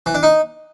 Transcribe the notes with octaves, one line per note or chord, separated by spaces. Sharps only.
E3
D4
D#4